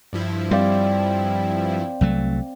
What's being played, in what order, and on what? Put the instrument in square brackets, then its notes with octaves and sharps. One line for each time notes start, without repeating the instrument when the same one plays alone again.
[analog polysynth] G2 F3 E4
[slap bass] G3 [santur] C4 D5 F5
[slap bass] C2 F#3 A3